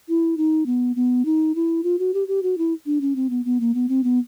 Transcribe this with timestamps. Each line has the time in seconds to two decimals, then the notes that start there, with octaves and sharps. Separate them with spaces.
0.09 E4
0.37 D#4
0.66 B3
0.96 B3
1.25 D#4
1.55 E4
1.84 F4
1.99 F#4
2.14 G4
2.28 G4
2.43 F#4
2.58 E4
2.86 D4
3.01 C#4
3.16 C4
3.30 B3
3.45 B3
3.60 A#3
3.74 B3
3.89 C4
4.04 B3